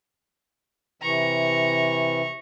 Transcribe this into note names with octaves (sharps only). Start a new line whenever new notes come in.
C3 E3 A#5 C#6